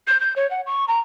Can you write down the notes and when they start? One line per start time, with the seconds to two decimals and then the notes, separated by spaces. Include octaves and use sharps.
0.07 G6
0.20 G6
0.36 C#5
0.51 F#5
0.66 C#6
0.88 A#5